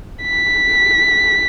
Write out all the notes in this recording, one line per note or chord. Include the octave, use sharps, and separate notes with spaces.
B6